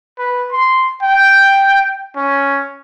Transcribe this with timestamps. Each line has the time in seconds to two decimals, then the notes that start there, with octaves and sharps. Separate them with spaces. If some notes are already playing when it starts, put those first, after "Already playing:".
0.18 B4
0.52 C6
1.03 G5
2.16 C#4